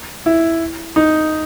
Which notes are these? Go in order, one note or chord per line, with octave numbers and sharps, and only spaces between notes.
E4
D#4